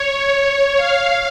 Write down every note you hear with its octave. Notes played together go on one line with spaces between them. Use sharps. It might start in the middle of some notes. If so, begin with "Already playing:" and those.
Already playing: C#5
F5